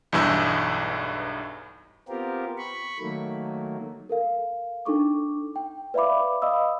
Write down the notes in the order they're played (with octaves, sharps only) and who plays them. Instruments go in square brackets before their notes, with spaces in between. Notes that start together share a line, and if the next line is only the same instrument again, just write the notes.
[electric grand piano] B1 E2 G2 E3 E6
[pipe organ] B3 C4 F4 G4 A#4
B5 C#6
D#3 F#3 A3 A#3
[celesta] A4 A#4 F5
D4 D#4 A4 C#6 D6
G5
B4 D5 E5 F5 B5 D6
D#5 F5 B5 D#6 E6